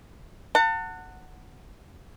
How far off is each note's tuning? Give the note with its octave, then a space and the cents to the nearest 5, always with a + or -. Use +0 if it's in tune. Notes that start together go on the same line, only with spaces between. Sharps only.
F#5 +0 A5 +40